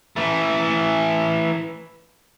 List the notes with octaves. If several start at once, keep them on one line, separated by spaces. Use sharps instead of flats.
E3 A3